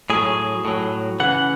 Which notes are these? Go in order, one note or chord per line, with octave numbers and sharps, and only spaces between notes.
A2 F#3 G#4
A2 F#3
C#3 E3 F#5